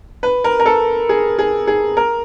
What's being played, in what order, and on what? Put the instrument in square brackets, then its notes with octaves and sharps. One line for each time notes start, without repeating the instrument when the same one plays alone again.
[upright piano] B4
A#4
A#4
A4
G#4
G#4
G#4
A#4